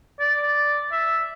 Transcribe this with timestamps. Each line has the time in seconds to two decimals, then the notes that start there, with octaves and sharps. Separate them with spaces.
0.20 D5
0.92 E5